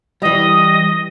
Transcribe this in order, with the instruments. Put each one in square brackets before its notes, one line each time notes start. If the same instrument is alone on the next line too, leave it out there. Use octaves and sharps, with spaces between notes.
[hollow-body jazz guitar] E3 G3 [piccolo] D#5